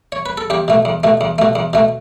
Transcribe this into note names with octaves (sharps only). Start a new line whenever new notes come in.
C#5
B4
A4
E2 G4
B2 A3
E2
B2 A3
E2
B2 A3
E2
B2 A3